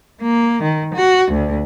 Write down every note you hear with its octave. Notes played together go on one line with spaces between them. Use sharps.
A#3
D#3
F#4
D2